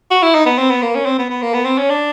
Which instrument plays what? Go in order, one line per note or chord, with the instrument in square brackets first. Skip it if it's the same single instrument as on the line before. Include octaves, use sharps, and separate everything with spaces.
[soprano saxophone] F#4
E4
D#4
B3
C4
B3
A#3
C#4
C4
B3
B3
A#3
B3
C4
C#4
D4